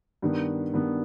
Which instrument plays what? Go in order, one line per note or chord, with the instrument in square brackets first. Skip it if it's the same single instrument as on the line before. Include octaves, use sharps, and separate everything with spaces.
[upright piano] G2 D#3 B3
G2 D#3 B3